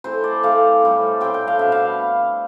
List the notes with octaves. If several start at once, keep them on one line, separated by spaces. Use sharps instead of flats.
E3 A3 C4 C5
D5
E3 A3 C4 F5
A2 G3 C4
A2 G3 C4 G5
G5
F5
B2 B3 D4 E5
F5